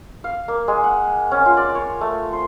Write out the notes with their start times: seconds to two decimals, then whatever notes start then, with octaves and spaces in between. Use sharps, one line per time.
0.24 F5
0.48 A#3
0.68 G#3
0.84 F#5
1.32 C#4
1.46 F4
1.57 D5
1.75 C#5
2.01 A3
2.33 C5